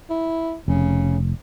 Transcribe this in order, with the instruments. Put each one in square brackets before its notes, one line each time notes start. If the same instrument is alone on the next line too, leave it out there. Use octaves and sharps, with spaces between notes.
[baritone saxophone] E4
[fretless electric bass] F1 [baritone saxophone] C#3